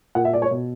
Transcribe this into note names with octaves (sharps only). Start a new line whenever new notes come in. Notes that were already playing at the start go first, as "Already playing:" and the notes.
A#2 F#5
E5
D5
C#5
B2